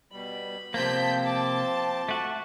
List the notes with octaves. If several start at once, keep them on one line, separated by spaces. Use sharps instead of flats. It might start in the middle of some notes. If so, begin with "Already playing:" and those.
B2 G3 B5
C3 F3 A#3 C4 A5 G6 B6
A5 C6 D6
A3 F#4